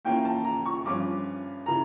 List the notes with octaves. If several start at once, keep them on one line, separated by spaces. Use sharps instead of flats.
A2 E3 A#3 C#4 F4 G5
A5
A#5
C#6
G2 F3 C#4 F4 D6
C#3 E3 A#5